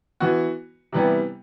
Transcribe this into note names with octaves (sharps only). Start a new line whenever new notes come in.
E3 B3 F#4
C3 E3 G3 B3